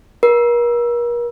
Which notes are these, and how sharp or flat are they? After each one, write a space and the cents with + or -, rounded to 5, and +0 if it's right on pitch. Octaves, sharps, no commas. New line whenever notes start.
A#4 +40